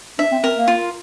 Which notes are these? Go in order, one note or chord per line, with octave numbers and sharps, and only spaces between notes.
D4 E5
C4
C4 A#4
A#3
F4